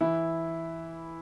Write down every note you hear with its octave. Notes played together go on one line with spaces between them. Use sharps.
E3 E4